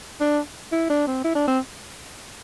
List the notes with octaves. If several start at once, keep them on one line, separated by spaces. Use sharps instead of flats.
D4
E4
D4
C4
E4
D4
C4